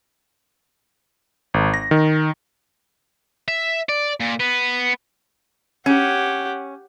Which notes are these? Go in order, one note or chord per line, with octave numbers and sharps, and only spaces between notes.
G#1
A#6
D#3
E5
D5
A#2
B3
C#4 G4 F#5